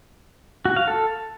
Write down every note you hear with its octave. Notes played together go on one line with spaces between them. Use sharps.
F#4
F5
A4